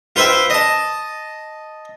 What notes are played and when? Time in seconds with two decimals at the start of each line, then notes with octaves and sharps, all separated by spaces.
0.16 F4 B4 C5 E5 G5
0.50 D#5 A5